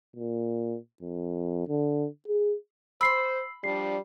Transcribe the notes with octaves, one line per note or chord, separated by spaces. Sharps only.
A#2
F2
D3
G#4
C5 B5 C6 E6 C7
F3 G3 D4 C7